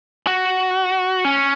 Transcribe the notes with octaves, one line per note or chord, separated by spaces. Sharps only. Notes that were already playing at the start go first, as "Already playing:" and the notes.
F#4
C#4